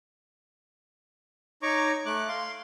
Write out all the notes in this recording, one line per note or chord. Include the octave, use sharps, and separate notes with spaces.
D#4 C#5 A#5 C#6 D6
A3 D6 F#6
F5 C6